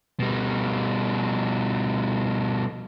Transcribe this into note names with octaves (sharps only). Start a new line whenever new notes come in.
B2 G3